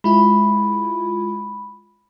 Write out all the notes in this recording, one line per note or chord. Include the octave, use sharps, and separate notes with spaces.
G#3 E4 F4 B5